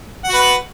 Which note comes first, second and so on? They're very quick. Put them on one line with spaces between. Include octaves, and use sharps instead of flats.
F#5 F#4 B4